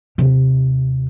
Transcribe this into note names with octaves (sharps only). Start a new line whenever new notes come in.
D#2 C3